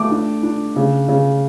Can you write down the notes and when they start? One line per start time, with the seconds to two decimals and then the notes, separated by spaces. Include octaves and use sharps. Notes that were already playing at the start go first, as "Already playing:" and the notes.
Already playing: A3 D6
0.11 D4
0.43 D4
0.76 C#3
1.08 C#3